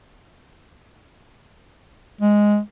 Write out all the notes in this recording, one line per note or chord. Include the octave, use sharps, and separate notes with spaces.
G#3